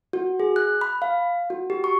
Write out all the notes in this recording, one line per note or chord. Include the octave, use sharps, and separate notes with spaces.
F#4
G#4
F#6
B5
F5
F#4
G4
C#6